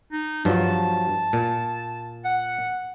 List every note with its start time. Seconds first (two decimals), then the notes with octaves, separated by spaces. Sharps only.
0.12 D#4
0.45 G2 F3 F#3 A5
1.33 A#2
2.25 F#5